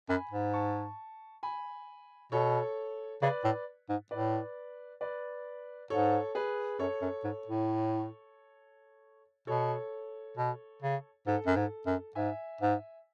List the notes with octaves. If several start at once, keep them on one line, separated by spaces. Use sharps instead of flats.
F#2 G#5 B5
G#2
A5 C#6
G#5 B5
B2 A4 C#5
C#3 B4 D5
A2
G#2
A2 B4 D5
B4 D5
G#2 A4 C#5
G#4 B4
F#2 A4 C#5
F#2
G#2
A2
B2 A4 C#5
B2
C#3
G#2 A4
F#2
G#2
F#2
G#2 E5 G#5
G#2